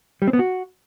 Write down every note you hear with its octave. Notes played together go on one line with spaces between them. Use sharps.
G3
C4
B3
F#4